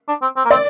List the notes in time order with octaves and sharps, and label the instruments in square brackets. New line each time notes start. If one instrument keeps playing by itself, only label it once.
[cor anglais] D4
C4
C4
A#3
[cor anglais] C4 [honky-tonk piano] D5